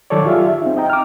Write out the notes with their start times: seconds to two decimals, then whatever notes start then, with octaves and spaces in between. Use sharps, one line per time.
0.10 D#3 F#3 A4 C#5 D5
0.25 F4 G4 G#4 E5 F5
0.48 E5
0.62 C4 D#4
0.77 D#5 G5 A#5
0.90 D6 F6